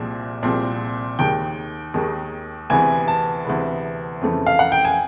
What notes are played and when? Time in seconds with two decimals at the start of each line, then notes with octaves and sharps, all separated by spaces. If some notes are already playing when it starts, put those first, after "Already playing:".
Already playing: C2 A#2 F3 G#3 C4
0.43 C2 A#2 F3 G#3 C4
1.19 D#2 D#3 G#3 G5
1.94 D#2 D#3 G#3
2.70 D2 C3 E3 G#3 B3 G#5
3.08 A5
3.45 D2 C3 E3 G#3 B3
4.21 F2 C#3 E3 A3
4.47 F5
4.59 F#5
4.72 G5
4.85 G#5